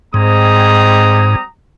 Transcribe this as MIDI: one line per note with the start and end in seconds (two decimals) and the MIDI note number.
0.14 1.36 44
0.14 1.46 55
0.14 1.40 56
0.14 1.40 60
0.14 1.46 82
0.14 1.46 87